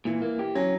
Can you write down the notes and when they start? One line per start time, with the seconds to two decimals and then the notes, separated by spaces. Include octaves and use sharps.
0.05 A#2 E3
0.22 A#3
0.39 G4
0.55 F#3 C#4